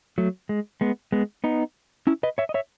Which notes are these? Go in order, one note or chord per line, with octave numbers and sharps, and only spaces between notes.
F#3 A3
G#3
G#3 B3
G#3 B3
B3 D#4
C#4 E4
B4 D#5
C#5 E5
D#5
C#5 E5